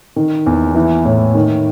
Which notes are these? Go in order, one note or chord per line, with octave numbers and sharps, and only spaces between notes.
D#3
E2
E3
A2
D#3